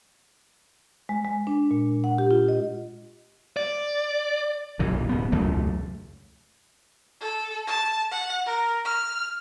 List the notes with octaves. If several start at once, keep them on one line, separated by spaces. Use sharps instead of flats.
G#3
G#3
D4
A#2
F#5
G4
F4
D#5
D5
B1 F#2 A#2 E3
D1 B3
E1 C#2 F#2 A3
A4
A5
F#5
A#4
F6